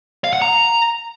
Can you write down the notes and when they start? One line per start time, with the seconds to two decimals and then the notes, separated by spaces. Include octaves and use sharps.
0.24 F5
0.33 F#5
0.42 A#5